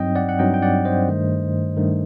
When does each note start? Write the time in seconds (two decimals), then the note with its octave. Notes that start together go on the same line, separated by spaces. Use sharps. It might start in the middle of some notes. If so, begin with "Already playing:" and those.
Already playing: G2 F#3 C4 D#4 D#5 G5
0.15 D5 F#5
0.29 F#5
0.39 G2 F#3 C4 D#4 D#5 G5
0.54 G5
0.62 D5 F#5
0.85 C5 D#5
1.08 G2 D#3 A3
1.77 G2 D#3 A3